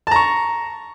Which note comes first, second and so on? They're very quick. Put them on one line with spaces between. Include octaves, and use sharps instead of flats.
A5 A#5 C#6